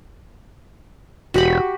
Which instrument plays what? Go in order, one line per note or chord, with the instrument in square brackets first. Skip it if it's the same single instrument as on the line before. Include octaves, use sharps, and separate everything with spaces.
[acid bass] E1 [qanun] F#4 G4 B5